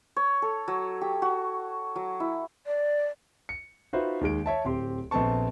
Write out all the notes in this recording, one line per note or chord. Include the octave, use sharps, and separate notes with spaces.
C#5
A4
F#3
G4
F#4
F#3
E4
D5
C#7
D#4 F4 F#4 B4 C5 E5
D#2 D#3 G#3 D7
C#5 E5 A5
D1 C4 G4 C6
A#1 B3 C4 A4 A5 C#6